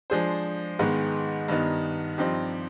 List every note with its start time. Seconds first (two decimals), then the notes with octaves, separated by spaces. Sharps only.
0.10 F3 G#3 D4 G#4 C5
0.79 G#2 D#3 G#3 B3
1.48 G2 D#3 B3 D#4
2.18 G2 F3 C4 D#4 G4